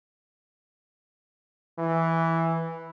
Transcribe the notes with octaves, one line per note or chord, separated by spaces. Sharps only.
E3